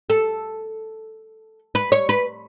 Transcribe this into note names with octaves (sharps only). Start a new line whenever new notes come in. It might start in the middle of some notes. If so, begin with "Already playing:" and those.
A4
B4
C#5
B4